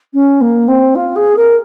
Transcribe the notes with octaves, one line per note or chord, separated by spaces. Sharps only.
C#4
A#3
C4
F4
G#4
A#4